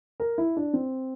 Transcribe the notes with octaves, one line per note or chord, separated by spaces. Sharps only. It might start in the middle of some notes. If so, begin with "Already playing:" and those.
A#4
E4
D4
C4